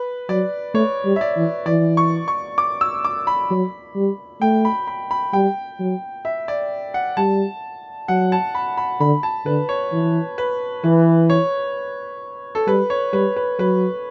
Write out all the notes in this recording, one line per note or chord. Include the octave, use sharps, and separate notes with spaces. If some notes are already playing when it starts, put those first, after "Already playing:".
Already playing: B4
F#3 D5
A3 C#5
G3
E5
D5
E3
E3 D5
C#6
C#6
D6
E6
D6
B5
F#3
G3
A3 G5
B5
B5
B5
G3 G5
F#3
E5
D5
F#5
G3 A5
F#3 F#5
A5
B5
B5
D3 B5
A5
D3 B4
C#5
E3
B4
E3 B4
C#5
A4
G3 B4
C#5
G3 B4
B4
F#3 B4